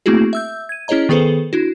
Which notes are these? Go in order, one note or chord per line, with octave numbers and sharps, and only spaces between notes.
A3 A#3 C4 E4 F#4 G#4
E5 E6 G6
G#6 D#7
C#4 E4 G#4 C#5 D#5 A#5
D#3 B3 G#4 A4 B4 C5
D4 E4 F#4